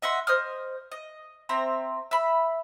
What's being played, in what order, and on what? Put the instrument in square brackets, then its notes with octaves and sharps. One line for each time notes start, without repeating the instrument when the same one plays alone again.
[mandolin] D#5 E5 F#5 C6
C5 D#5 D#6 F6
D#5
C4 E5 A#5
E5 B5